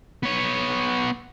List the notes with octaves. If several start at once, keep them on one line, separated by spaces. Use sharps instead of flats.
B3 C#5